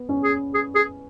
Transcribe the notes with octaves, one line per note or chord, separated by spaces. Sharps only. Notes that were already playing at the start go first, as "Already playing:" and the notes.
Already playing: B3
C#4
G#4
G#4
G#4